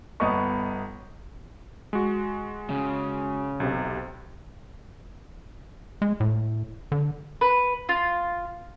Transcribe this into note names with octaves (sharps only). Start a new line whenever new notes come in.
G1 B3 B4 D#5 C#6
G#3 F#4
C#3
B1 C3
G#3
A2
D3
B4
F4